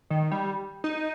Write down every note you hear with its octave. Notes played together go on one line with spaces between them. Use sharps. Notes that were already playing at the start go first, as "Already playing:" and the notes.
D#3
G3
D#4